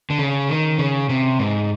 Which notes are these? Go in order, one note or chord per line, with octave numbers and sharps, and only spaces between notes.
D3
C#3
D#3
C#3
C3
G#2